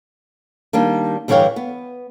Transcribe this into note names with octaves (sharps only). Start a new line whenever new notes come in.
D#3 G3 A#3 D4
G2 D3 E3 C#5 F5 G5
B3